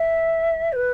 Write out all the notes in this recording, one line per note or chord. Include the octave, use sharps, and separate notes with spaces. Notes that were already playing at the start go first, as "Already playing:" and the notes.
Already playing: E5
C5
B4